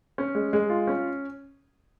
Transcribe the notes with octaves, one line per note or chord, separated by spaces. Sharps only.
C#4
G#3
G#3
F4
C#4